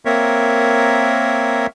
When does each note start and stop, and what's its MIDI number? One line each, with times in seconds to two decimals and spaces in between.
0.05 1.67 58
0.05 1.67 60
0.05 1.67 70
0.05 1.67 73
0.05 1.67 76